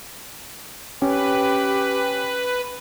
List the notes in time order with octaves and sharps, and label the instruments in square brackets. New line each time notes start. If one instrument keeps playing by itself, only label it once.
[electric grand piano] C#4 [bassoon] G4 [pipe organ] B4